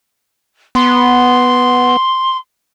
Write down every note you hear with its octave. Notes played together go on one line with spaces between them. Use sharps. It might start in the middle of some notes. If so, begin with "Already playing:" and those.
B3 C6